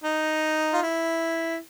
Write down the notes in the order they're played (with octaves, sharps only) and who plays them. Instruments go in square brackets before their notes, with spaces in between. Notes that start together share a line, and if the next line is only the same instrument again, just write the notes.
[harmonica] D#4
F4
E4